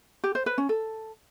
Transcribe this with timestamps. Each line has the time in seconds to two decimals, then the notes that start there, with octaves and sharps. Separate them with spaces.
0.24 G4
0.35 C5
0.46 B4
0.58 C#4
0.69 A4